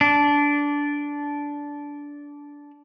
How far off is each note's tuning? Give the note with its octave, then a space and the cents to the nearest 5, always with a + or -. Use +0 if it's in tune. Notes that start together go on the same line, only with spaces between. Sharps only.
D4 -15